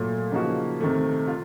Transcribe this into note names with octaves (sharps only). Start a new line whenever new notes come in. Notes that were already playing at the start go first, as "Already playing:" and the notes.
Already playing: A#2 F#3 A3
C#3 F3 A#3 D#4 F#4
C3 D#3 A3
F4